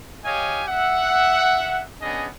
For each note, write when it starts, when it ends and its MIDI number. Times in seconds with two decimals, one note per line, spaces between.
0.25 0.63 67
0.25 0.63 73
0.25 0.63 75
0.25 0.63 77
0.25 0.63 80
0.68 1.81 76
0.68 1.81 78
2.01 2.27 59
2.01 2.27 61
2.01 2.27 62
2.01 2.27 68
2.01 2.27 75